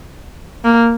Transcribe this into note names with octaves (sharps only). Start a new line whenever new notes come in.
A#3